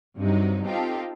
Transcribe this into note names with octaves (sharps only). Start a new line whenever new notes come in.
G2 C3 F#3 D#4
C4 D#4 F4 G4 A4